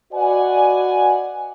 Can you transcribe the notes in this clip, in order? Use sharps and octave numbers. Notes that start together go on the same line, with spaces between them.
F#4 B4 D5 D#5 F#5 G#5